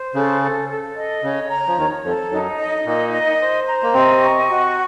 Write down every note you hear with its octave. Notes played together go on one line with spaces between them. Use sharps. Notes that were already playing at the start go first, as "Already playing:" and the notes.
Already playing: C5
C#3 A4
A4
A4
D#5
C#3 C#5
A#5
F3
D#2 D#3 C#5
F2 F3 A4
F#2 F#3 D#4
D#5
A#2 A#3 D#4
D#5
C5
A#5
A#3
C3 C4 D#5
C#6
F#4